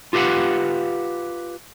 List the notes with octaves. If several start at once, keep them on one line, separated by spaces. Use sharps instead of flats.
F4 G4 B4 F5 F#5